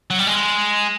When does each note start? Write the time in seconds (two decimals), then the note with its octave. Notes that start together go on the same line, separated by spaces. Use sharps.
0.10 F#3
0.19 G3
0.27 G#3